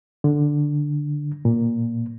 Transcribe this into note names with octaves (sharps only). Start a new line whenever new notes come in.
D3
A#2